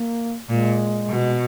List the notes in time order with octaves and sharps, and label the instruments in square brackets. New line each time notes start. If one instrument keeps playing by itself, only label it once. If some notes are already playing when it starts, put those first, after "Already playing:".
Already playing: [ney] A#3
[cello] A#2 [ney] G#3
[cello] B2